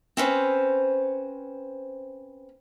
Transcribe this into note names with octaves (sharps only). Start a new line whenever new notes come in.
C4 C#4 B4 C5